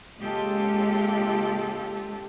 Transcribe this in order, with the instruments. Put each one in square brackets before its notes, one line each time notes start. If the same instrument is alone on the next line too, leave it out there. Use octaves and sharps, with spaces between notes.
[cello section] C#3 G#3 A#3 F4 G4 A4